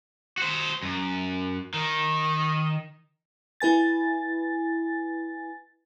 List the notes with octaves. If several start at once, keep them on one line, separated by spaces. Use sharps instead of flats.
F#4 C5
F#2
D#3
E4 B4 G#5 A6